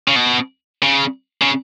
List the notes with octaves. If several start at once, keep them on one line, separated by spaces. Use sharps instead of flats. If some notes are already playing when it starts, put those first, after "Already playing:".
C#3
B2
C#3
C#3